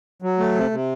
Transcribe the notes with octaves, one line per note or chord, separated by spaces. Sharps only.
F#3
A3
C3
C3